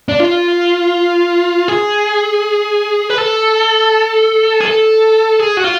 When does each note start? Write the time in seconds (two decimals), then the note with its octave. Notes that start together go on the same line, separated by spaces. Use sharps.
0.09 D4
0.20 F4
1.68 G#4
3.10 B4
3.18 A4
4.60 G#4
4.65 A4
5.40 G#4
5.57 F#4
5.64 F4